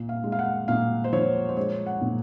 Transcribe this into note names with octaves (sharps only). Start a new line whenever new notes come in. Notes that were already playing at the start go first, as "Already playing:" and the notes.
Already playing: A#2
F5
G#3
F5
F#5
A#2 F5
C5
F3 C#5
C5
G#3 C#5
F#5
A#2